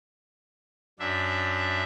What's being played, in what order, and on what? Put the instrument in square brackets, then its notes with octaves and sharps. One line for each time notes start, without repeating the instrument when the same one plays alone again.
[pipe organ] F#2 D4 E5